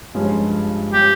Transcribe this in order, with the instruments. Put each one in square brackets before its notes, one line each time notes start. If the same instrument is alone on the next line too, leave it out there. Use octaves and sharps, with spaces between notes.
[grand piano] G2 F3 G#3 C#4
[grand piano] G3 C#4 F4 [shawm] G4